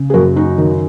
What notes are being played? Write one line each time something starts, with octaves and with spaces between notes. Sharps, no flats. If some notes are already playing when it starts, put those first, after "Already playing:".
Already playing: C#3
G#4
F#2 F#4 A#4
D#4 F#4
D#3